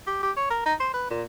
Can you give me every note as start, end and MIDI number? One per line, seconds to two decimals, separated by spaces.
0.07 0.19 67
0.23 0.31 67
0.36 0.48 73
0.50 0.61 70
0.66 0.74 63
0.80 0.92 72
0.94 1.06 71
1.10 1.23 46